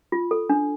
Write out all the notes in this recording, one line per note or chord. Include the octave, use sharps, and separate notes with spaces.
F4
A4
D4